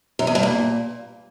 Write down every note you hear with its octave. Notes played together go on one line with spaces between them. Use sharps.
F#2
E2
G2
A#2